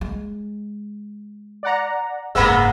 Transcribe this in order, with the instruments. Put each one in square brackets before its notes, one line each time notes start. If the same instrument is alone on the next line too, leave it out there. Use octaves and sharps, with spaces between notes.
[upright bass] G#3
[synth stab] D5 F#5 A#5
[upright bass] F#1 G#2 [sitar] G#3 A#3 B3 [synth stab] A#5 B5 E6